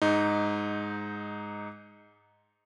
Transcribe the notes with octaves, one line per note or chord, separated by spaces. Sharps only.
G#2 D#4